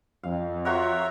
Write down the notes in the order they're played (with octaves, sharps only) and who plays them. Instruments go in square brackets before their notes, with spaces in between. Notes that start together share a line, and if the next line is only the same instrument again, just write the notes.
[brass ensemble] F2 [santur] F5
[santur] F4 F#4 A#4 [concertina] C#5 E5 A#5